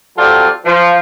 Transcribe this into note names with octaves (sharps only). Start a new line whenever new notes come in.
F#3 G3 C4 F4 A4 D5
F3